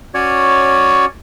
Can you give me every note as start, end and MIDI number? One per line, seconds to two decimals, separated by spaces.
0.14 1.05 61
0.14 1.05 66
0.14 1.05 73
0.14 1.05 74